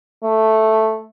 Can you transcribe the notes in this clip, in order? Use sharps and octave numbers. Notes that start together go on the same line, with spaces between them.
A3